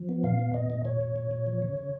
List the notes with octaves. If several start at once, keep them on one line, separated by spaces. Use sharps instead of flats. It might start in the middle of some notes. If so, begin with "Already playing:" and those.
Already playing: F3
B3
A#2 F5
B3
A#2 D#5
A#2
A#2 C#5
A#2
A#2
A#2
F3
C#3
C#3